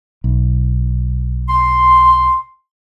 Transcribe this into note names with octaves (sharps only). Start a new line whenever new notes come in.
B1
C6